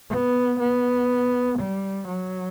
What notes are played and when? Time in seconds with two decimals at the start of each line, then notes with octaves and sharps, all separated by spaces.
0.10 B3
0.59 B3
1.59 G3
2.08 F#3